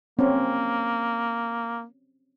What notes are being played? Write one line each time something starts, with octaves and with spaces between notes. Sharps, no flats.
A#3 C4 C#4